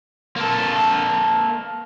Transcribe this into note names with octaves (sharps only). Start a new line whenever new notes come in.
A#3 A4